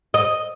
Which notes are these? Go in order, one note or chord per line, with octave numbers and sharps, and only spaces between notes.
D#5